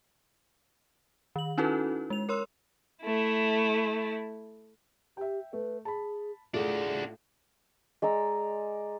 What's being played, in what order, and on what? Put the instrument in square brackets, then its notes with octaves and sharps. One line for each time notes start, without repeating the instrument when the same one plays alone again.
[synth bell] D#3 F#7
C#4 D#4 E4 F#4 A4 B4
G#3 F7
A#4 C#5 C6 E6
[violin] A3 E4
[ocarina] G4 [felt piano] E5 G5
[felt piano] A3 [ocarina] B4
[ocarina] G#4 [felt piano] A5 B5
[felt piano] A2 A3 F4 [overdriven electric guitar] D4 F#4 [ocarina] G#4
[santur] G#3 D5 A#5 E6